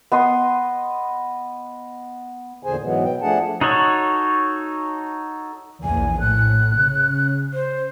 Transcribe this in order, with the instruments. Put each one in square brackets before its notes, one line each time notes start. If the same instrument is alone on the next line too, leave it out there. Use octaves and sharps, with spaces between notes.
[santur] B3 D#5 C6 D#6
[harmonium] E2 A#2 D3 G#4 C5 G#5
G#2 B2 E3 F#3 G#3 B3
G5
F3 A3 D4 G#4 F#5 A5
[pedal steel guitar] D#4 F#4 A4 C#5
[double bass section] A#1 E2 [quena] G#5
[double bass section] A2 [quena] F#6
[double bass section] C#3
[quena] C5